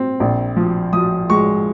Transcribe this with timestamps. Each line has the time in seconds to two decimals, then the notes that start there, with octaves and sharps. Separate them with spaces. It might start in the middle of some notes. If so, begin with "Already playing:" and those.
Already playing: C4
0.20 A#1
0.56 F3
0.93 F3 D#6
1.30 G#3 C#6